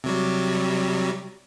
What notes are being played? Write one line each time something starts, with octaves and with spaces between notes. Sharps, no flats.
C3 F#3 G3